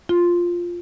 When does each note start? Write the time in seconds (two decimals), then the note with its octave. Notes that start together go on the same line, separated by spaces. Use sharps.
0.09 F4